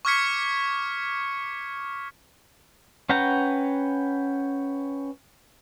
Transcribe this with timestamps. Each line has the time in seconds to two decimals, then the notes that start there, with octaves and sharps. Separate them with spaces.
0.05 C#6 D6 F6 G#6 B6 C#7
3.09 C#4 B4 F#5 G5 A#5